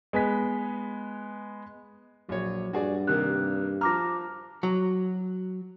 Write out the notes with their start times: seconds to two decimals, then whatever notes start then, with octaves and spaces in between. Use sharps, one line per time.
0.13 G#3 B3 G#5 B6
2.29 A#1 F#3 C#5
2.73 G2 F#4 G#4 D5
3.07 C3 D#3 A#3 F#6
3.81 F3 A#5 D6 F6 A#6
4.63 F#3